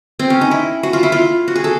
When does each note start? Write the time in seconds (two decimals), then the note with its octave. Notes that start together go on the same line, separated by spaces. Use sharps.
0.19 C4
0.30 C#4
0.41 D#4
0.51 E4
0.83 F#4
0.93 F4
1.03 E4
1.12 F4
1.48 F#4
1.55 G#4
1.64 A4